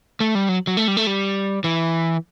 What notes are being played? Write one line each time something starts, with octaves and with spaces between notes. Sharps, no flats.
A3
G3
F#3
F#3
A3
G3
A3
G3
E3